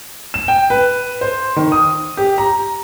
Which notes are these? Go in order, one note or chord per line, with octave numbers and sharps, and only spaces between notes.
E7
G5
B4
C5
D#3
D#6
G4
A#5